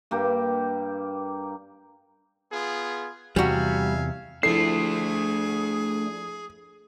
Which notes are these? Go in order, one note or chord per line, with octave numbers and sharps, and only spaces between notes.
G2 A#3 G4
B3 F4 G#4
E2 C3 G3 F#4 E5 F5 G#5
F3 A3 D4 E4 G#4 A4 C7